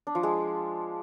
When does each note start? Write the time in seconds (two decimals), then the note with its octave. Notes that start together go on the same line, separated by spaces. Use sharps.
0.07 D4
0.15 F3
0.23 G#3